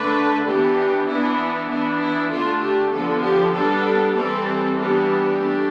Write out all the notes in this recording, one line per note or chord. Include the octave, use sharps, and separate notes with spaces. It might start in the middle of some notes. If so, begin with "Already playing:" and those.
Already playing: D3 A3 D4 B4
E3 B3 D4 G4
E3 B3 D4 E4
E3 B3 D4 E4
E4
D3 A3 D4 F4
G4
D3 F3 B3 A4
G4
G3 B3 D4 A4
E3 G3 C4 A4
E3 G3 B3 D4 G4
A3 D4